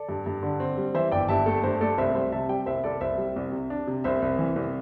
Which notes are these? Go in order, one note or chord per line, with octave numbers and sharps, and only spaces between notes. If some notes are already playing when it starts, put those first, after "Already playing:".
Already playing: A4 D5
G2
G2
D3
C4
G3
E3 C5 E5
G1 D5 G5
G2 E5 A5
A3 A4
G2 C5
A3 A4 D5
C2 C5 E5
G3 C5 E5
C3 E5 A5
G3 D5 G5
C2 C5 E5
C2 A4 D5
C2 C5 E5
G3
C2
C3
D4
C3
C2 C5 E5
C2
E3
C2